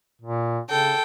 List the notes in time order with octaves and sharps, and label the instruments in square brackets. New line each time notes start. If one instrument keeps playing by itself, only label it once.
[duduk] A#2
[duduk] C#3 [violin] A4 G5